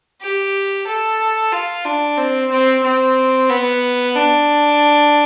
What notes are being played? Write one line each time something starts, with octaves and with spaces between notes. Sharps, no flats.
G4
A4
F4
D4
C4
C4
C4
B3
D4